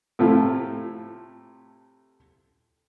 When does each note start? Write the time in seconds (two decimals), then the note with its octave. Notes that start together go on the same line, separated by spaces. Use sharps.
0.19 A2 C3 F3 A3 E4 F4